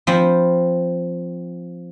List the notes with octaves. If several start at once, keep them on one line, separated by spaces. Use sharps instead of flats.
F3 C4 B5